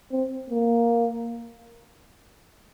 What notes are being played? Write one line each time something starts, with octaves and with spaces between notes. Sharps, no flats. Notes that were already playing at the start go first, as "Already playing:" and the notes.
C4
A#3